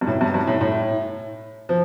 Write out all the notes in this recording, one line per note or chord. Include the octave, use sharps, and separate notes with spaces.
G2
A2
G2
G2
A2
A2
F3